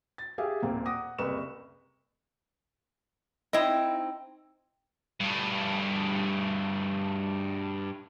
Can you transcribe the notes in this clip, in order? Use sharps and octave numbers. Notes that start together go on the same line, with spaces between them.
A6
G4 G#4 E5 F5
D#1 A#2 A#3 C4 F5
F#5 D6 D#6 A#6
F#1 C2 B4 C#6 E7
C4 D#4 E4 D#5
G2 A3